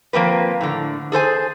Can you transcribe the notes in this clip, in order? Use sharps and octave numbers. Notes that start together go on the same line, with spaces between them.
F3 A#3 C4 B4
A2 D3
G#4 A4 C5 G#5